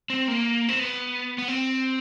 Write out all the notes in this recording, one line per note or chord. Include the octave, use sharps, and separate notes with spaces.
C4
A#3
C4
B3
B3
C4